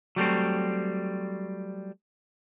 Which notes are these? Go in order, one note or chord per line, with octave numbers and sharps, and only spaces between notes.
F#3 G3 A3 C4